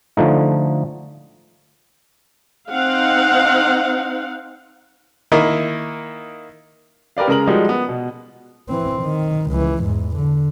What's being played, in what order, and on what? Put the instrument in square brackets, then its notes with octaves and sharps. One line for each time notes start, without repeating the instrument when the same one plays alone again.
[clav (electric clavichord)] D3 F3 A3 D#4
[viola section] C4 D#4 F5 F#5
[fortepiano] D#3 A#3 E4 A#4 D#5
[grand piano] G4 A#4 B4 D5 F5
C#3 G#3 A#4 A#5 F#7
F3 G3 G#3 D#4 F#4 A#4
B3
B2
[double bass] E3 C4
D#3
C#2 E3
E2 G#2
D3